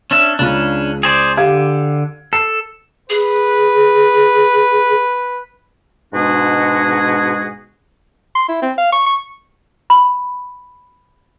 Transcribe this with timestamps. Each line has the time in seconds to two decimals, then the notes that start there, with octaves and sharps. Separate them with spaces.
0.11 C#4 D4 E5
0.39 C#2 C#3 C#4 D4
1.03 G#4 C5 D5
1.37 D3 G4 F5 G#6
2.33 A4 C7
3.10 G#4 B4
6.14 G#2 B2 G#3 D4 F#4 G#4
8.35 C6
8.49 E4
8.62 C4
8.78 F5
8.92 C#6
9.06 C#6
9.90 B5